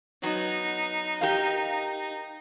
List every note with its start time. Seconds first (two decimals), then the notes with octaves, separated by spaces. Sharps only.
0.23 F#3 B3 D#4
1.21 G4 A#4 F5